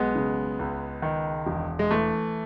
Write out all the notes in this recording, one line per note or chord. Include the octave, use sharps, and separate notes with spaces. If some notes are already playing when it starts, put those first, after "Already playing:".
Already playing: B1 G#3 B3
C#3
C#2
D#3
E1
G#3
E3 A3